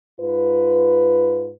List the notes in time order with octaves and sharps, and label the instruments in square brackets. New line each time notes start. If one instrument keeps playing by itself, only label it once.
[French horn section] G#2 F4 B4